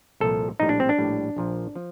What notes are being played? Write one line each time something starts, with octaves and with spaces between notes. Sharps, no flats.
C2 A#2 F3 A4
A#1 A2 G3 D#4
D4
C4
D4
A#1 A2 G3
A#1 A#2 F3
F3